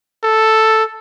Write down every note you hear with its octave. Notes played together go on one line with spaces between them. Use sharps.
A4